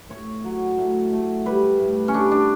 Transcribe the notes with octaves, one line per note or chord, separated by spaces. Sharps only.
A2 C#5
F#3
A2
A3
G3 B4
A2
C#4
G3 D4
D4